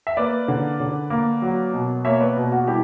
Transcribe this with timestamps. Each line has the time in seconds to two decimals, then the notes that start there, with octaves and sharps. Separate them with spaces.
0.07 E5
0.17 A#3 B4 D5
0.48 D3
0.80 D3
1.10 A#3
1.42 F#3
1.73 B2
2.05 A#3 C#5 E5
2.20 B4 D5
2.37 B2
2.52 F#4
2.67 G3 E4 G4